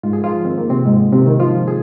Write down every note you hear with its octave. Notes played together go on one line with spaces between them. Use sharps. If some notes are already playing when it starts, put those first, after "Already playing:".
G#2 F4
G#4
F3 F4
D#3 C4
A#3
C3 C4
G#2 G#3
C3 C4
D#3
F3 F4
G#4